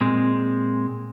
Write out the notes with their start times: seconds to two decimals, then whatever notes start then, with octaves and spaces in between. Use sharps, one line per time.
0.01 A#2 G#3 C4